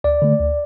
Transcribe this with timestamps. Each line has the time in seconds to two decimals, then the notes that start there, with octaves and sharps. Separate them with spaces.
0.04 D2 D5
0.22 D3 A3
0.40 D2